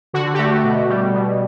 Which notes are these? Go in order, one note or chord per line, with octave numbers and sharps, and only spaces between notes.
D3 F#4
G4
A3 F#4
B2
G3
B2